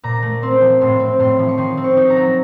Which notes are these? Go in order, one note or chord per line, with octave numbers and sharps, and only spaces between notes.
A#2 A#5
A3
C4 C6
F3
A2 C6
C4
A2 C6
F3
C#6
D#3 C6
C4
C#6
D#4
A#5
F#3